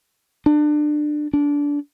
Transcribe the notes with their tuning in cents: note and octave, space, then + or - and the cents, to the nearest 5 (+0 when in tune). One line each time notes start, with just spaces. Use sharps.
D4 +25
D4 -20